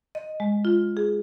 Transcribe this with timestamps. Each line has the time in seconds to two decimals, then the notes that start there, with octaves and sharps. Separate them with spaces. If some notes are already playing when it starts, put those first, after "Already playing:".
0.15 D#5
0.40 G#3
0.65 F4
0.97 G#4